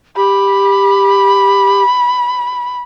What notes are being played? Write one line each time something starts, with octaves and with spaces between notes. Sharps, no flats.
G4 B5